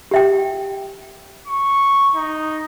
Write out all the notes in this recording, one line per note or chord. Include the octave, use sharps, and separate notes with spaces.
G4 E5 G5
C#6
D#4